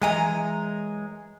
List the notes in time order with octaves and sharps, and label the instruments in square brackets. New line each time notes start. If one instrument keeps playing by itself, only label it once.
[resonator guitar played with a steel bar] F#2 E3 D#5 [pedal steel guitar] G#3 G#5 A#5